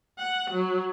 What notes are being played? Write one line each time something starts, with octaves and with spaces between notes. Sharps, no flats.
F#5
F#3